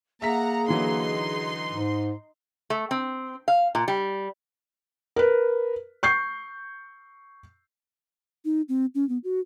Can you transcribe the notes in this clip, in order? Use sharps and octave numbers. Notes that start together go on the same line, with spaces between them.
A#3 G#4 E5 F#5 A#5 B6
D3 E3 F#3 D#4 C6
G#2
A3
C4
F5
A#2
G3
A#4 B4
C#6 G6 C7
D#4
C4
C#4
B3
F#4